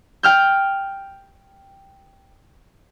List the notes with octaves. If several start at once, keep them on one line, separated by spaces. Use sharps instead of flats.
G5 F6 G6